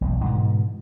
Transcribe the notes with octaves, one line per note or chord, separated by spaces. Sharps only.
E1 B1
G#2 B2 D3 E3